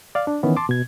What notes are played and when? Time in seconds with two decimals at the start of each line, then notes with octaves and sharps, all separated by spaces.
0.15 D5 F5
0.27 D4
0.43 D#3 E3 B3 C#4
0.57 A5 C6 D6
0.69 B2 G#6